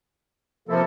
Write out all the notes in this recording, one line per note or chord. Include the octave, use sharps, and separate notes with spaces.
C3 F3 A#3 E4 A4